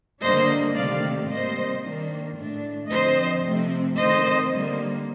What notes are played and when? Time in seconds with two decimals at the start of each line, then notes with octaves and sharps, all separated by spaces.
0.22 D3 G3 A#3 D4 C5 D#5
0.75 C3 D#3 A3 C4 D5 F5
1.29 C3 G3 A#3 C5 D#5
1.84 D#3 A#3 D4
2.37 A2 A3 D4
2.90 D3 F3 C4 C5 D#5
3.45 C3 F3 A3 C4
3.97 D#3 A3 C4 C5 D#5
4.51 D3 G3 A#3